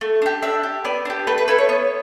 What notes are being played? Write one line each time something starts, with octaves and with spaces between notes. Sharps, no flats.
A3
D4 G4
D4 E5
G4
B3 D5
D4 G4
A3 B4
B4
E4 A4 B4
C#5
B3 C#5